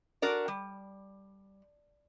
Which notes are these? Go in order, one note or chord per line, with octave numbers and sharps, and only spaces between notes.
D4 F#4 A#4 D5
G3